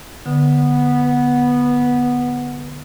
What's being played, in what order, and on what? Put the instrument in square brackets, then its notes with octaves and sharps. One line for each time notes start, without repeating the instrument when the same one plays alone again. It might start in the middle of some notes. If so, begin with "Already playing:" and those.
[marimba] D3 [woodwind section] B3